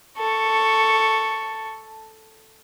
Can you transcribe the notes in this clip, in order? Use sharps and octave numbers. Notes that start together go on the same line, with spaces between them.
A4 C#6